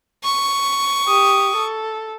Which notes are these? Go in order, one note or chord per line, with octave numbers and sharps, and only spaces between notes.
C#6
G4 D#6
A4